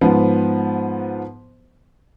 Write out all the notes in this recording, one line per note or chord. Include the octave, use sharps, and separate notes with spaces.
G#2 F3 B3